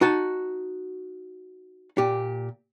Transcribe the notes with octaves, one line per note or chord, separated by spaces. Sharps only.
D#4 F#4 A5
A#2 G4